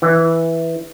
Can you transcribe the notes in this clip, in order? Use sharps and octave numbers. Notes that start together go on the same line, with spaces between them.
E3